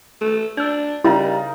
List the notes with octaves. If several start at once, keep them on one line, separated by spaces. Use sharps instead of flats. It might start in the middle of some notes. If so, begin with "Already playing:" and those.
A3
D4 E6 G6
C#3 G3 D#4 E4 A#4